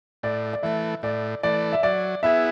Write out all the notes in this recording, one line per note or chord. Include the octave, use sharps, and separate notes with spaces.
A2 D5
D5
E3 A3 E5
A2 D5
E3 A3 D5
E5
F#3 D5
B3 E4 G#4 E5